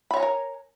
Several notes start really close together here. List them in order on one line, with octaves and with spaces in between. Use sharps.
B5 C#5 A#5 G#5 A#4